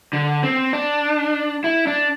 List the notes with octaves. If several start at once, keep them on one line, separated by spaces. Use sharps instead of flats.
D3
C4
D4
E4
D4